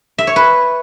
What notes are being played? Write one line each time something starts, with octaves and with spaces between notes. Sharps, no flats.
E5
C#5
B4